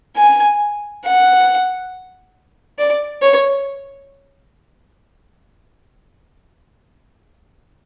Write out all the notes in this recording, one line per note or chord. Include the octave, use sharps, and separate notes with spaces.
G#5
F#5
D5
C#5